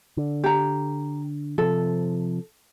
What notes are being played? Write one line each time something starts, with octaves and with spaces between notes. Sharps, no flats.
D3
G4 A#5
C3 F3 A4